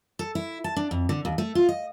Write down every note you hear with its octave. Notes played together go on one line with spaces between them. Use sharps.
A4
E4
A5
D4
F2
D3
D#2
A3
F4
D#5